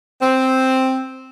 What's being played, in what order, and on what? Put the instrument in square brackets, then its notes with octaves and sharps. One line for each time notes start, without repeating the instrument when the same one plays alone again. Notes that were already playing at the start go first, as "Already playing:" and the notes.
[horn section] C4